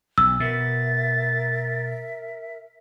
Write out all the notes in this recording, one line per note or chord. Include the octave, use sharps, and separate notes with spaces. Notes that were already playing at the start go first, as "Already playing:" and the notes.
B1 E6
B2 A#4 E5 A6